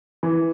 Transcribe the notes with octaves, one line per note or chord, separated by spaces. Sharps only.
E3